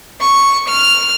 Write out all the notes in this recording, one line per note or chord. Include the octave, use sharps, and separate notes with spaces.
C#6
F6